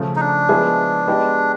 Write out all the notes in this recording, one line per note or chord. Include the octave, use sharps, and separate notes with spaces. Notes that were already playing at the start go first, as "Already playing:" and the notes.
Already playing: C#3 F3 A3
D#4
D4
F3 G#3 B3 E4 G#4
G#3 B3 D#4 G4